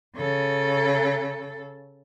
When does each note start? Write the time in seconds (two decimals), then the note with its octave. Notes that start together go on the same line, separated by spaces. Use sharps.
0.16 C#3 A4